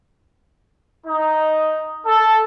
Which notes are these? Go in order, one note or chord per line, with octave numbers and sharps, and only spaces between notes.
D#4
A4